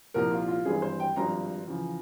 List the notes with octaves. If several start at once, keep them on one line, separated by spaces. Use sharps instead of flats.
C2 A#2 F3 A#4
F4
F4
G#1 G2 E3 G#4
C5
G5
G#1 G2 F3 A#5
E2 C#3 F3